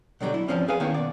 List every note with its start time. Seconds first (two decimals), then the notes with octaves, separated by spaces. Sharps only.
0.20 B2 D3 F#3 G3
0.34 E4
0.48 E2 G2 F3 C4 C#4
0.68 G#4 B4 F5 G#5
0.80 D#3 E3 A#3 B3 C#4
0.94 B1 D5